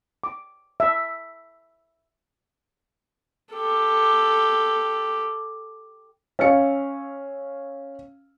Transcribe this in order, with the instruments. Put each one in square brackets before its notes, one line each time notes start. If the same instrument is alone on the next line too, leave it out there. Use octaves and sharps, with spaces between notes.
[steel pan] D6
E5
[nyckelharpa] G4 A4
[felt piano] C#4 F5 C#7